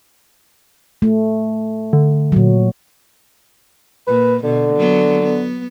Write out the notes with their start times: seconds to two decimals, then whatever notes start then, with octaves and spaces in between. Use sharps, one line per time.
1.02 A3
1.93 D3
2.32 A#2 F#3
4.07 A#2 B4
4.44 B2 D3
4.76 F#3 B3
5.23 B3